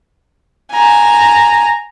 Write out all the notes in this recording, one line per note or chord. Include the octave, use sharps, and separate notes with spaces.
G#5 A#5